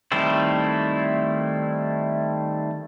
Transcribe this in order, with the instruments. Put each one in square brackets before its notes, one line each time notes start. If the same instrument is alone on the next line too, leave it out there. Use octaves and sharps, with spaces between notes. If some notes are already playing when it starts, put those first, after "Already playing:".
[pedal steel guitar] D#3 G3 A3 C4 E4